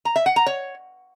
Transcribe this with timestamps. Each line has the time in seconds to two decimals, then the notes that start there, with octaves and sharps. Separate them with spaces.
0.05 A#5
0.16 E5
0.26 F#5
0.36 A#5
0.46 C#5